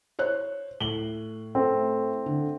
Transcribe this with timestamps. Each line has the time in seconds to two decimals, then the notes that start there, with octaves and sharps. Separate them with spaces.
0.19 C5 C#5 F#6
0.81 A2 F#7 G7
1.55 A3 C4
2.26 D3